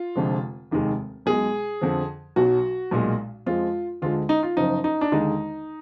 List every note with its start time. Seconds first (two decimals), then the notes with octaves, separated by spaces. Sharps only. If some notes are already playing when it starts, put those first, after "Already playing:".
Already playing: F4
0.16 F1 F2 D3 F3 G#3
0.71 F1 D#2 D#3 G#3
1.26 B1 B2 G#3 G#4
1.81 F2 D3 F3
2.36 B1 B2 F#3 F#4
2.91 B1 A#2 G#3
3.46 F2 F3 G#3 F4
4.02 D2 D3 G#3 F4
4.29 D#4
4.43 F4
4.57 F#1 F#2 F3 D#4
4.84 D#4
5.01 D4
5.12 D#2 D3 G#3 D#4